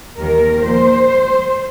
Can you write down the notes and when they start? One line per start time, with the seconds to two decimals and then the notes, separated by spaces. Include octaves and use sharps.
0.19 D#2 D#3 A#3 A#4
0.63 A#2 F3 A#3 C5